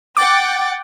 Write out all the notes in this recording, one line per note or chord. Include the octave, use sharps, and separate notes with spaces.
F#5 G5 D6 A6